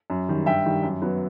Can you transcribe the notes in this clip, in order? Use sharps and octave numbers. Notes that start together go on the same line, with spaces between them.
F#2
D#3 G3
G2 E5 G5
D#3 G3
F#2
F#3 B3